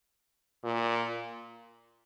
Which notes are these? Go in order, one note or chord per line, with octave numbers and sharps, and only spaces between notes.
A#2